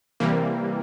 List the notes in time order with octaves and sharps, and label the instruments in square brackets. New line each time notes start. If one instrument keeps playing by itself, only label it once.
[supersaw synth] C3 E3 G3 A#3